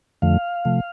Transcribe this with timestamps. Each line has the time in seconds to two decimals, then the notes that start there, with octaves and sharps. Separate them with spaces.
0.22 F2 D3 F3 A3 F5
0.65 C3 F3 A3